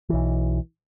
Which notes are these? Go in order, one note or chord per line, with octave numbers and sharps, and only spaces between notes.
B1 E3